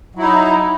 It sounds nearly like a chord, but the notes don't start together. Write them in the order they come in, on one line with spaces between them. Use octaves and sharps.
F#3 E4 D#4